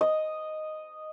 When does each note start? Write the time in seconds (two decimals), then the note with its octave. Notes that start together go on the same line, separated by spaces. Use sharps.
0.01 D#5